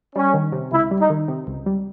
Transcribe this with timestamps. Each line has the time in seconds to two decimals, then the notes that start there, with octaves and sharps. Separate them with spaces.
0.16 G3 C#4
0.34 D#3
0.52 C3
0.72 C#2 E4
0.91 G3
1.00 D#4
1.10 D#3
1.28 C3
1.47 C#2
1.66 G3